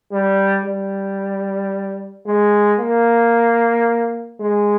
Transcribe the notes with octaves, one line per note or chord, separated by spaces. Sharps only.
G3
G3
G#3
A#3
G#3